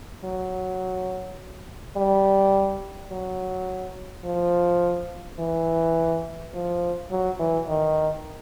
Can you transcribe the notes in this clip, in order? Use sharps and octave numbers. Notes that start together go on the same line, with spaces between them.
F#3
G3
F#3
F3
E3
F3
F#3
E3
D#3